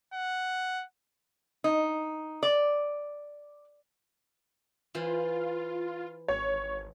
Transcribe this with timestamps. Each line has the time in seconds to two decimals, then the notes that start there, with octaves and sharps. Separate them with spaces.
0.14 F#5
1.64 D#4
2.43 D5
4.95 E3 F4 C5
6.28 G#1 C#5